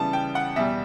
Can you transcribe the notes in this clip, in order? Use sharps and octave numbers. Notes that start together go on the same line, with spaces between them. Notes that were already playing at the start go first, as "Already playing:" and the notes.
Already playing: C#3 E3 G3 B3 A5
G5
F#5
E2 B2 G3 E5